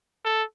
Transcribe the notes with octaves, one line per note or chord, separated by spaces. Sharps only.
A4